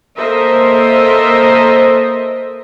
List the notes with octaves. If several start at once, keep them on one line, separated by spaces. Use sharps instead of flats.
A#3 A4 A#4 C5 D#5 E5